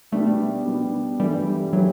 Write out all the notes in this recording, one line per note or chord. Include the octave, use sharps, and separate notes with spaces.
B2 G3 A3 D4
B2 G3 D4
G2 E3 G3 A3 E4 G4
E3 F#3 A3 E4 G4